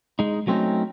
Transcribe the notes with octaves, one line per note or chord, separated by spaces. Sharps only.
G#3 D#4
F#3 A3 C4 C#4 D#4